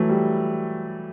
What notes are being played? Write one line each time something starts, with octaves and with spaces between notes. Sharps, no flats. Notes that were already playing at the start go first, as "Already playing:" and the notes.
Already playing: E3 F#3 A3
G3